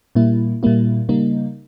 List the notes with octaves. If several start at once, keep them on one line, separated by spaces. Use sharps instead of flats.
A#2 G3 A#3 E4
A#2 G3 A#3 E4
C#3 G3 A#3 D#4